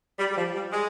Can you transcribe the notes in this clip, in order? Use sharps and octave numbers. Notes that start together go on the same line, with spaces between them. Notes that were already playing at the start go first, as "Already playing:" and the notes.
G3
G3
F3
G3
G#3